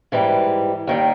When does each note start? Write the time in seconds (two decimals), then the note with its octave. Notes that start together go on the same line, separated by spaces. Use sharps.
0.12 G#2 E3 G3
0.87 D#2 D#3 G3